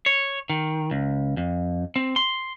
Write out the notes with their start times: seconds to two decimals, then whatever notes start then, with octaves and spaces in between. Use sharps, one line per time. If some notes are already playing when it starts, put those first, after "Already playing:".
0.06 C#5
0.50 D#3
0.91 C#2
1.37 F2
1.96 C4
2.16 C6